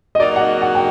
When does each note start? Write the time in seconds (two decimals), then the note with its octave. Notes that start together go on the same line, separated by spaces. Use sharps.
0.15 D#5
0.20 F#3 A#3 D#4 F#4 D5
0.36 F#5
0.41 D#5
0.62 F#5
0.75 G5